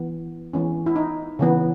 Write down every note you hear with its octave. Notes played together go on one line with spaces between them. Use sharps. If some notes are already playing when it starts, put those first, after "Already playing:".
Already playing: E3 B3
E3 G#3 B3 C#4
E4
D#4
C#3 E3 B3